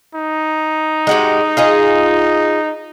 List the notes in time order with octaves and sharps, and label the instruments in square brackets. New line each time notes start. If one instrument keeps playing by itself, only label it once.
[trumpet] D#4
[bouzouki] G#3 F#4 G4
F4 G#4 D#5